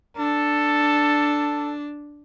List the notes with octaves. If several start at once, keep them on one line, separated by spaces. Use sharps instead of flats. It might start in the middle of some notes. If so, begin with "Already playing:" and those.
D4 A4